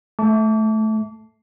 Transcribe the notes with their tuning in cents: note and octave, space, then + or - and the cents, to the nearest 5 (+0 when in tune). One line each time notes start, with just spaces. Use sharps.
A3 -15 A5 +0 D6 -35